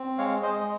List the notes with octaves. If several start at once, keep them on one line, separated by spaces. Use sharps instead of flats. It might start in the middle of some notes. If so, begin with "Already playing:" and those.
Already playing: C4
G#3 C#5 F5
G#3 C5 D#5
D#5